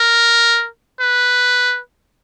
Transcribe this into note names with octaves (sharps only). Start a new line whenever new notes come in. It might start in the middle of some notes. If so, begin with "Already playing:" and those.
Already playing: A#4
B4